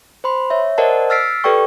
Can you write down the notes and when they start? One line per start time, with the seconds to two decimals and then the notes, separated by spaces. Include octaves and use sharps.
0.24 C5 B5 C6
0.50 C#5 E5
0.78 A#4 C5 D5 D#5 F#5 A5
1.10 E6 F6 A6 B6 C7 D7
1.44 G4 A4 B4 D5 G5 C#6